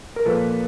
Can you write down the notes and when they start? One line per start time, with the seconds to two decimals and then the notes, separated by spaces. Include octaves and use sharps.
0.16 A#4
0.25 A#2 F3 A#3 A4 B4